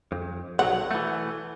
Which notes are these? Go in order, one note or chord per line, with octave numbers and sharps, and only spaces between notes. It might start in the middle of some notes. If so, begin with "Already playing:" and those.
F2
B1 F#3 F#5
E3 A3